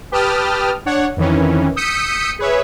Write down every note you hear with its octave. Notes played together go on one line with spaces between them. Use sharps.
G4 B4 G5 A5 D#6 F6
D4 C#5 F#5
F2 D#3 E3 C#4
D#6 E6 G6 B6 C#7 D#7
G#4 B4 C#5 E5